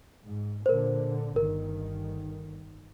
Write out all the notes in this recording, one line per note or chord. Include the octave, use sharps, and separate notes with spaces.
G#2
A#2 D3 A#4 C5
G1 D#3 A#4